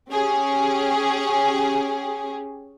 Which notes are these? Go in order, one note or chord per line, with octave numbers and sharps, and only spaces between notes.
C#4 G4 G#4